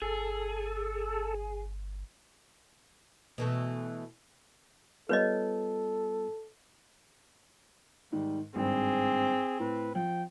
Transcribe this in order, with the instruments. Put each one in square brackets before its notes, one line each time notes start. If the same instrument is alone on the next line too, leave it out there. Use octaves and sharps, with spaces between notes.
[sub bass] G1 [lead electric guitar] G#4 [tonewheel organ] A4
[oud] B2 E3 A3
[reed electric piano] G3 B3 F4 [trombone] A4 [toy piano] B4 C#5 D#5
[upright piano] G#2 D#3 [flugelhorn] G3
[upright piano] G#1 G2 [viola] C4 [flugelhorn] G#4
[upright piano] A2 [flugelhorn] B4
[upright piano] F3 [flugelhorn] G5